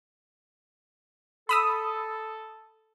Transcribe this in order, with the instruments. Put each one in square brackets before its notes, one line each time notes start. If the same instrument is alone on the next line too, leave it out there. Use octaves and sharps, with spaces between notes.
[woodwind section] A4 [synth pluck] B5 D#6 E6